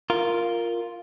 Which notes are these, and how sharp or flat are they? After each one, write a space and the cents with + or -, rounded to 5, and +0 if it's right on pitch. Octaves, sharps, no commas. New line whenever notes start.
F4 +0 A#4 +0